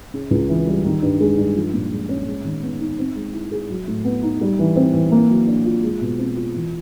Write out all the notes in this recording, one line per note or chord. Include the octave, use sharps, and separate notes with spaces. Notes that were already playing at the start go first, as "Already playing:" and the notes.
C#3
C#2
E3
G3
D#3
G2
G#3
G2
F3
A#2
G#3
C#4
G#3
D#3
B3
D#4
C4
G#3
E4
G#4
F#3
A2
B3
D#4
G3
E3
C4
E3
A#3
F#3
D4
F4
G#3
B2
C4
F4
E3